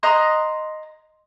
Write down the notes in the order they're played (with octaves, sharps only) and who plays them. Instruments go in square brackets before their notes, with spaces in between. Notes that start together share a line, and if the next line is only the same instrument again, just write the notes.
[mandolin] D#5 A#5 C6 F#6